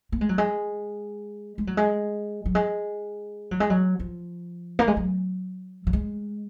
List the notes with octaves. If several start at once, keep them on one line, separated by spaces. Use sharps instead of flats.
A#3
G#3
F#3
G#3
G#3
F#3
G#3
F#3
G#3
F#3
G#3
F#3
F3
A#3
G#3
F#3
F#3
G#3